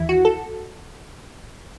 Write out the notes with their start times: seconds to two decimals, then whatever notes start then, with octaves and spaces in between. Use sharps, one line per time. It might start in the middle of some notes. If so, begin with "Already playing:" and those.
Already playing: D#2 E3 E4
0.09 F#4
0.25 A4